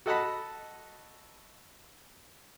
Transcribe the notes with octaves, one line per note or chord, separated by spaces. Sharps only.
F#4 A4 D#5 F#5 A5 B5